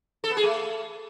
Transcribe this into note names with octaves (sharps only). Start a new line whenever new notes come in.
A4
B3
G#4
A3